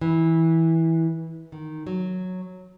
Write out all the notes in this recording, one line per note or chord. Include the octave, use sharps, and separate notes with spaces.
E3
D#3
F#3